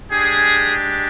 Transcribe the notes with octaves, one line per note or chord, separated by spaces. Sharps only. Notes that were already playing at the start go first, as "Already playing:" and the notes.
G#3 D4 G4 G#4